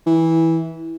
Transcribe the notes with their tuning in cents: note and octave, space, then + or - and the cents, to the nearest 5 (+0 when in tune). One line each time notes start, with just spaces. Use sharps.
E3 -15